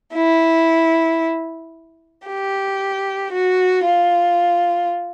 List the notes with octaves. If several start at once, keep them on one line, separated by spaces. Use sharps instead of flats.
E4
G4
F#4
F4